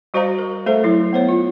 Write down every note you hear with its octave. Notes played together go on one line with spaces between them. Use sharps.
G3 F#4 C5 D5 F5 A#5
A#4
A3 A4 C5 E5
F#3 E4
B3 C5 C#5
F4